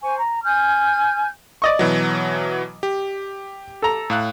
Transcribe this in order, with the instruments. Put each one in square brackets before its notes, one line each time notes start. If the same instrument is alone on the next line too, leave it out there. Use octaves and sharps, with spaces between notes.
[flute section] C5 G#5 C#6
A#5
G#5 F6 G6
[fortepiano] D5 D#5 C#6
[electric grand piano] B2 E3 F#3
G4
[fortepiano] A4 A#5
[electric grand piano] A2 F5 F#6